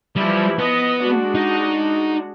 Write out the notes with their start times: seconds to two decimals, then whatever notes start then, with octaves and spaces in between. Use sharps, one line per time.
0.16 E3 F3 G3 E4
0.59 B3 D#5
0.99 G#3 D4 F#4
1.35 D#4